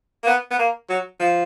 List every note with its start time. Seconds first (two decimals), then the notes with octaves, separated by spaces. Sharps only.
0.24 A#3
0.27 B3
0.51 B3
0.59 A#3
0.89 F#3
1.20 F3